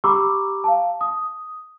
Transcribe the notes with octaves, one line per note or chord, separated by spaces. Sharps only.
G4 A#5 B5 C#6 D6 E6
F5 A5
D#6